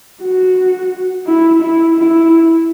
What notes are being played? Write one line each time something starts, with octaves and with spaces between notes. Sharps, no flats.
F#4
E4
E4
E4